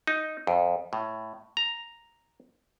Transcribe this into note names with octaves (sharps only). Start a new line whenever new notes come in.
D#4
F2
A2
A#5